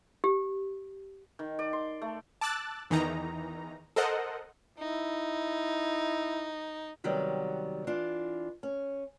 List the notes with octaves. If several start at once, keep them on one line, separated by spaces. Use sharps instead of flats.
G4
D#3
D5
C6
A3
A5 D6 E6 F#6 A6
E2 D#3 E3 D#4 A#5
A4 A#4 C5 D#5 F#5
D#4 E4
C3 D#3 F#3 G3 B3
E3 D4 F4
C#4